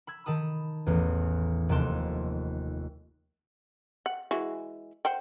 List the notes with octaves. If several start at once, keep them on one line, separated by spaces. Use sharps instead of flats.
B5 E6 G#6
D#3 A5 B5 D#6
A1 E2
F1 D#2 A#3 A5 C6
F#5
E3 G#3 F#4
C5 F#5 G5